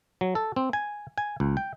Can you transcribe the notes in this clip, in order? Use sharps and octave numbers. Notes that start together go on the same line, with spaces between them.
F#3
A4
C4
G#5
G#5
C#2
G5